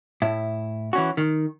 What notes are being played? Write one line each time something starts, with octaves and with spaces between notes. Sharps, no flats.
A2 E4
E3 C#4 F#4
D#3